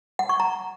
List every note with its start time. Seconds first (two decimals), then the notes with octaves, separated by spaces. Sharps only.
0.19 F#5
0.29 C#6
0.40 A#5